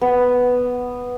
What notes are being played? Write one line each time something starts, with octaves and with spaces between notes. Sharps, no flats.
B3